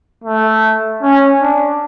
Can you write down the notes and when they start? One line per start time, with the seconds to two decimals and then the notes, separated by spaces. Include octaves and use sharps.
0.24 A3
1.02 C#4
1.41 D4